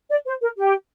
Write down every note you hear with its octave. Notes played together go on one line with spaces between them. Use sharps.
D5
C5
A#4
G4